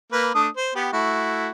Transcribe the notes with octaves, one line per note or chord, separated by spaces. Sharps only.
A#3 B4
A3 D4 D#6
C5
B3 G4 B4
A3 E4 F#4